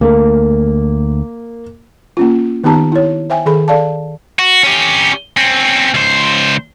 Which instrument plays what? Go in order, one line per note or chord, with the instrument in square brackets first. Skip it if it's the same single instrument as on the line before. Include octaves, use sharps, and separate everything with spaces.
[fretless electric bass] D2 A3 [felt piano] A#3
[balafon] A#3 C#4 F4
D#3 B3 D#4 G4 A5 A#5
E4 C#5
C5 E5 G5 G#5
D#3 G#4 A4 B5
A4 D5 F5 A5
[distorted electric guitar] F#4
C#4 G4
C4 C#4
C#2 C5